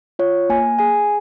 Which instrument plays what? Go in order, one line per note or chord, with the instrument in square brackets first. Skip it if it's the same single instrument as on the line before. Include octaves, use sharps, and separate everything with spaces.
[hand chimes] F4 C#5
A#3 G#5
G#4 G#5